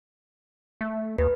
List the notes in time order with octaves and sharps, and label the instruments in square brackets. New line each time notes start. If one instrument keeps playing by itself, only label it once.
[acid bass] A3
[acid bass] D#2 [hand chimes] B4